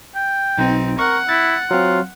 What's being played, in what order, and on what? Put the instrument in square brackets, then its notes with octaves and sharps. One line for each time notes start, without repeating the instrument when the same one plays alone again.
[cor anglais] G5
[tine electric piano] B1 [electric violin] C4 D#4
[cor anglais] A#4 [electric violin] F#5 [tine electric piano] C#6
[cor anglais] E4 [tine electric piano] A6
[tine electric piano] F#3 C4 [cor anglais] F4